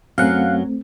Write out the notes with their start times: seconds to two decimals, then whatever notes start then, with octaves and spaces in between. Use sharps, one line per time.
0.18 F#2 F#3 A3 C4 F5 F#5